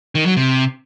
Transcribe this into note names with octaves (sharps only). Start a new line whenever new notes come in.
D#3
F#3
C3